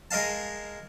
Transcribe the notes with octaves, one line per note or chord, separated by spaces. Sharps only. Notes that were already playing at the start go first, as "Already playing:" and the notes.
G#3 A#4 D#5 F5 A5